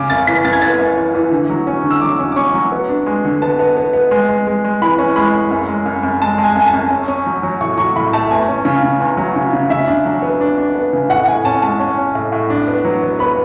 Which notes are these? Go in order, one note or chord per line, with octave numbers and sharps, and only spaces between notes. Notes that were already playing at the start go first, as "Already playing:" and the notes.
Already playing: C#3 D6
F#2 A6
E3 B6
F#2 A6
G#6
B3 A6
F#2
E3
E3
D3
F#3
C#4
D3
E6
F#3 D6
C#4
D6
C#4 C#6
F#3
B3
D4
G#3
D3
B3 A5
B3
B3
B3
G#3
G#3
G#3
G#3
E3 B5
C#4
G#3 B5
G#3
F#2
G#3
F#2
F#2
G#3 A5
G#3
G#5
F#2 G#5
A5
F#2
C#4
C#4
F#3
F#3
A2 C#6
F#3 C#6
A2 B5
A3 A5
E2 G#5
C#4
C#3
C#3
E2
F#3
C#3
C#3
C#3 E5
D4
F#3
B3
D4
D4
B3
C#3
A2 F#5
A2 G#5
C#4 A5
G#3 A5
C#4
C#4
A2
A2
D4
B3
F#3
B3
B3 B5